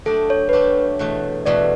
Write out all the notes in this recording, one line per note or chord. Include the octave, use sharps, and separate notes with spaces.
F#3 A3 D4 G4 A4
C#5
B4
F#3 A3 D4 G4 C#5
E2 B2 A3
E2 B2 A3 D5